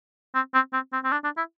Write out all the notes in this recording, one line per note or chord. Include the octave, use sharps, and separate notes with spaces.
C4
C4
C4
C4
C4
D4
D4
E4